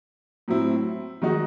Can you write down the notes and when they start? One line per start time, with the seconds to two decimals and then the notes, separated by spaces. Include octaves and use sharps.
0.48 A2 F#3 C4 E4
1.22 D#3 G#3 D#4 F#4